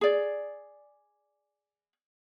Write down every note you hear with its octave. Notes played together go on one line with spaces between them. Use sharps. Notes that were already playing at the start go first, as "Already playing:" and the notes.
G#4 D5